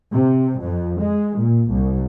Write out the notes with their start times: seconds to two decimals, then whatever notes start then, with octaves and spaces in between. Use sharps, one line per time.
0.13 C3
0.62 F2
1.01 G#3
1.39 A#2
1.71 C2